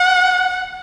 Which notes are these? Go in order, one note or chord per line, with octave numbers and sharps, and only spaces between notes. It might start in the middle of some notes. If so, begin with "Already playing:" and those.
Already playing: F#5